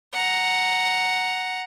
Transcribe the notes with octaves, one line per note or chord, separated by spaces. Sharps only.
F#5 A#5